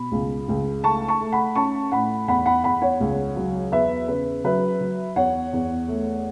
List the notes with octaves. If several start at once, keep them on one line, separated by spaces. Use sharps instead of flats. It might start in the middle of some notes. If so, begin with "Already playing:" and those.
Already playing: B2 B5
C#2
C#2
A3 A5 C#6
A5 C#6
A3
F#5 B5
C#4 A5 C#6
A2 F#5 B5
E2 F#5 B5
F#5 B5
E2 F#5 B5
C#5 F#5
C#2
F#3
E2 B4 E5
C#3 B4
F#3 B4 E5
F#3
E2 C#5 F#5
E2
A3